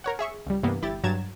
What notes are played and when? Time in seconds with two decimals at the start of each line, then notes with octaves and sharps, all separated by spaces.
0.04 A#4 C#5 F#5
0.19 G#4 E5 C#6
0.47 C#2 G3
0.63 G2 C3 E3 A#3 B3
0.82 G1 E4 G4 A6
1.04 G2 F#3 A#5 G#6 A6 E7